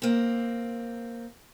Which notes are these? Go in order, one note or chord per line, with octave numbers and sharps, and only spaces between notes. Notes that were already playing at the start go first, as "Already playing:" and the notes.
A#3 C4